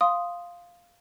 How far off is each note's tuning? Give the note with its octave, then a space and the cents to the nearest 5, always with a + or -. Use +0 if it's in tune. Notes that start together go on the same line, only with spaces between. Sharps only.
F5 +0 C6 +0 D#6 +0